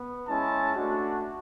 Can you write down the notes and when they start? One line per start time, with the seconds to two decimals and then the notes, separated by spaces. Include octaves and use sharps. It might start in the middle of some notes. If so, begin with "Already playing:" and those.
Already playing: B3
0.28 G#3 C#4 E4 A5
0.76 A3 D4 F#4